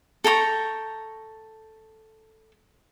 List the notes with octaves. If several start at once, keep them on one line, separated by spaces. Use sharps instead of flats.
A4 G5 A#5 C#6